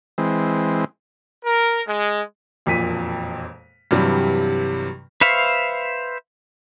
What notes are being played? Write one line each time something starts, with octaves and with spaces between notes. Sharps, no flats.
E3 G#3 C4
A#4
G#3
E1 F2 A#2 B6 D#7
G2 C3 E3 F#3 G3
B4 C5 E5 F5 C#6